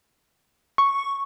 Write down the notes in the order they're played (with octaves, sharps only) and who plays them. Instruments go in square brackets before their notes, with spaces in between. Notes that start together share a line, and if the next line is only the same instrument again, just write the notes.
[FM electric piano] C#6